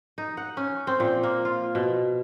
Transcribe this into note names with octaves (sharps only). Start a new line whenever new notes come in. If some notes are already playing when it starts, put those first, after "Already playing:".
D#4
F#5
C#4
C4
A#2
A#3
F4
B2